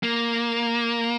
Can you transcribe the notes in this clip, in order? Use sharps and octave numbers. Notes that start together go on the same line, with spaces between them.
A#3